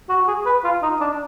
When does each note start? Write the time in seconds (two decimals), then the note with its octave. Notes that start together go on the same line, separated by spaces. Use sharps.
0.09 F#4
0.28 G#4
0.46 B4
0.64 F4
0.82 D#4
1.01 D4